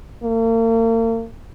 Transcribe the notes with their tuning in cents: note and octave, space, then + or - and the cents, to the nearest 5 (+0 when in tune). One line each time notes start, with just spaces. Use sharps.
A#3 -40